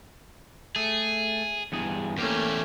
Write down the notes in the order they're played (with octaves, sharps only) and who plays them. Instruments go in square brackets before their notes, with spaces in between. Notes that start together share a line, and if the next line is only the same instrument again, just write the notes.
[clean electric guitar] A3 [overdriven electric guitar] G#4
[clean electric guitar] E2 G2 G#4
[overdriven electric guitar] E2 G4 [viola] A3 C#4 [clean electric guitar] A#3